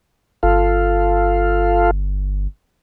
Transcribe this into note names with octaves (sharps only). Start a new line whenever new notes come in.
G1 F4 A4 F5